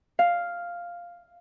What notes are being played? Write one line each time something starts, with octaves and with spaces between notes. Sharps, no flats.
F5